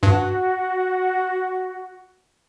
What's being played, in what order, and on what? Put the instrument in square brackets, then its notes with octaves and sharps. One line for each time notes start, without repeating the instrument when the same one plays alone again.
[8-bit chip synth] G2 [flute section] F#4